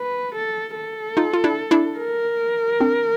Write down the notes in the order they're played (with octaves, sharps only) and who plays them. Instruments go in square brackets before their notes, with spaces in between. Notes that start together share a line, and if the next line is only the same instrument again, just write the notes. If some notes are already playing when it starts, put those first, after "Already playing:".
Already playing: [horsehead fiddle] B4
A4
A4
[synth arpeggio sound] D#4 F4
F4
D4 E4
D4 E4
[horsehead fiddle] A#4
[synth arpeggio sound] C4 D4